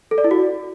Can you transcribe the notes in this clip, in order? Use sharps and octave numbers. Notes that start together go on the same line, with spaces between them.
A4
D5
E4
F#4